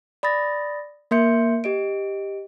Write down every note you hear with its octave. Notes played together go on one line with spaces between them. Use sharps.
D5 B5 D#6 A6 A#6
A#3 A#4 E5 C6 G6 C#7
G4 D#5 D7